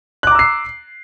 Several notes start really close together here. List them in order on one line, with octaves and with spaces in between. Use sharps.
F#6 D6 A#5 E6 C7